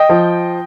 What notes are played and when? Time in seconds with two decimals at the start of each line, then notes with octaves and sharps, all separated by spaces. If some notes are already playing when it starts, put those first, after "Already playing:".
Already playing: D#5 G5
0.09 F3